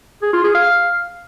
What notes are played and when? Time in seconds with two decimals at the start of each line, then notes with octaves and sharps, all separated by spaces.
0.22 G#4
0.33 F4
0.44 G#4
0.55 F5